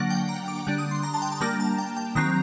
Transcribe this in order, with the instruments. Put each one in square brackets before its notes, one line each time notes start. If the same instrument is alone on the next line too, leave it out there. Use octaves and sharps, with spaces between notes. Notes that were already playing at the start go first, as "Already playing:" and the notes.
Already playing: [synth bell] D3 F#3 A#3 D4 F#5
G5
A#5
D6
D3 G3 D4 F#6
D#6
C6
A#5
A5
G5
A5
G3 A#3 D4 A#5
A5
G5
G5
D#3 F#3 C4 A#5